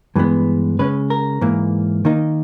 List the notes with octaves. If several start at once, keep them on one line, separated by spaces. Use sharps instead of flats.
G2 E3 G#3 B3
C#3 G#3 C#4 B4
A#4
G#2 E3 A#3
D#3 A#3 D#4